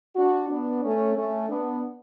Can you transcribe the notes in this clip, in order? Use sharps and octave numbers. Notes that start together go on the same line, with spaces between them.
D4 F#4
B3 D4
A3 C#4
A3 C#4
B3 D4